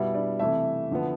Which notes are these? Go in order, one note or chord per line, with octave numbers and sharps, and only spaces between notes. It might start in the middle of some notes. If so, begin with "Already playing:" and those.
Already playing: B2 G3 B3 E4 E5
D4 D5
C3 E3 A3 E4 E5
D3 F3 B3